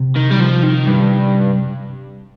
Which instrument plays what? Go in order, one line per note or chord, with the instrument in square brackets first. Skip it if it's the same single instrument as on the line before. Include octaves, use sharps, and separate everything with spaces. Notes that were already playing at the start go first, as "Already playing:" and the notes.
Already playing: [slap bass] C3
[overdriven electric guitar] D#3
G3
F3
D#3
G2